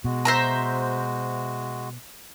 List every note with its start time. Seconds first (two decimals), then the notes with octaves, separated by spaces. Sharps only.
0.04 B2 G#3 F#4
0.25 C5 E5 A#5